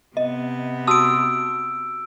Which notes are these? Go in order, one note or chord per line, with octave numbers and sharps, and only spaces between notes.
C3 B3 D#5
F#4 A5 D#6 E6 D7